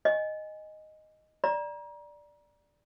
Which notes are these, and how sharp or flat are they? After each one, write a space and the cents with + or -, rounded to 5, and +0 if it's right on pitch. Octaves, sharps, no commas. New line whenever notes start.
D#5 -5 G#5 -10
D5 +0 A#5 +30